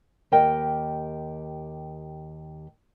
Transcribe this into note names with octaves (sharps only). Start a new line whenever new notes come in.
D#2 G4 A#4 D#5 G5